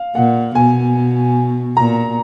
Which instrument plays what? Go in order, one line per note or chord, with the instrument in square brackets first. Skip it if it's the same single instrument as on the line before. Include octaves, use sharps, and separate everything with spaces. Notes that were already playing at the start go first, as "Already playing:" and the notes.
Already playing: [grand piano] F5
[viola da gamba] A#2 [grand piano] F#5
[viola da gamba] B2 [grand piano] G#5
[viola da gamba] A#2 [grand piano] A#5